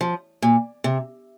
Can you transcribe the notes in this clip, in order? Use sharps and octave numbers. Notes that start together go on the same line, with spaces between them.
F3
A#2
C3